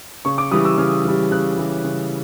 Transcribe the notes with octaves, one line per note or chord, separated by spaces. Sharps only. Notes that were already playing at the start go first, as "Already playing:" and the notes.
C#3 C#6
D6
E3 G3 D#6
E6
C#3 F6
E3 G3
C#3 F#6
E3 G3
C#3